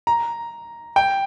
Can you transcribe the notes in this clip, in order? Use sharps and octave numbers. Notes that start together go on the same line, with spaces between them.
A#5
G5